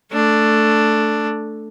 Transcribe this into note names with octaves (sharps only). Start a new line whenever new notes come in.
A3 D4